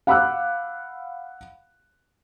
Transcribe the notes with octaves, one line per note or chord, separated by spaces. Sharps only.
F5 F#5 B5 D6 E6 F#6